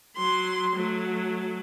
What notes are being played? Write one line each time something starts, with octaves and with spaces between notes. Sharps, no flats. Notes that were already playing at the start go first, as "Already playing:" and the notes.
F#3 C6
F#3 A3